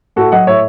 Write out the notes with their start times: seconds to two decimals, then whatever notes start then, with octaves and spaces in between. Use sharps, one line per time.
0.16 A2 F#4 A4
0.32 F#3 D#5 F#5
0.47 A2 C#5 E5